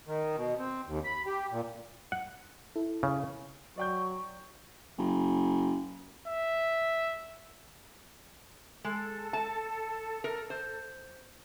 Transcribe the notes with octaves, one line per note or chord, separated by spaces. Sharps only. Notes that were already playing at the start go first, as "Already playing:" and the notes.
D#3
B2
C4
D#2
B5
G4
A#2
F#5
E4 A4
C#3
F#3 D5 G5 C#6 G6
F#1
E5
G#3 A4
A5
A#4
C5